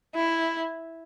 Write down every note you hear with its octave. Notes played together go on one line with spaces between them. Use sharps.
E4